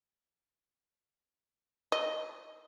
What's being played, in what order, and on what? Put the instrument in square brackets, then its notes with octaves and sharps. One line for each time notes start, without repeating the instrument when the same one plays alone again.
[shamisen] D#5